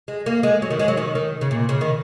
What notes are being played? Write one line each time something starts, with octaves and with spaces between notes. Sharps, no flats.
G#3
A#3
G#3
F#3
D#3
G#3
F#3
D#3
D#3
C#3
A#2
C#3
D#3